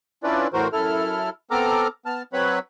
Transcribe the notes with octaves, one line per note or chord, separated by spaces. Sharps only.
C#4 D4 E4 F4 B4 D5
A2 E3 F#4 A#4 C5
F#2 E4 A4 F6
B3 C4 A4 A#5 D6 F6
B3 A5 F6
F#3 C4 B4 C#5 F#5 B5